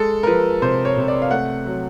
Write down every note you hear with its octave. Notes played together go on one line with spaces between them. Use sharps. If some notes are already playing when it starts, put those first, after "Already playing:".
Already playing: G#3 A4
A#4
F3 B4
C3 C5
C#5
C3
D5
F5
A3 F#5
F#3